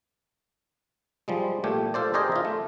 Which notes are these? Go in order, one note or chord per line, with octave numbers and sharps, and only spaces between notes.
F3 G3 G#3
A#2 A3 G4
F4 A4 C5 D5
G4 G#4 A#4 C5 D5 D#5
F4 E5
A3